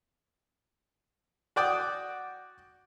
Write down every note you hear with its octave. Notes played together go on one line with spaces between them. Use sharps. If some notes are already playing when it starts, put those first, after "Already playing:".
F#4 D5 G5 D6 D#6